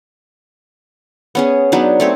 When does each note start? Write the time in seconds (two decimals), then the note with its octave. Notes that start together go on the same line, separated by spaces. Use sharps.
1.35 B3 C#4 G#4
1.72 F#3 B3 D4 D#4
2.00 A3 C4 C#5